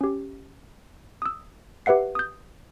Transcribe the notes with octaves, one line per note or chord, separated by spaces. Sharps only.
C#4 G4
D#6 E6
G4 B4 E5 F#5 C7
D#6 G6